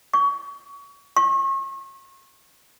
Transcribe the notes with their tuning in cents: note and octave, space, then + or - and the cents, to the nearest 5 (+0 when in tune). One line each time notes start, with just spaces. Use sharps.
C#6 +30
C#6 -40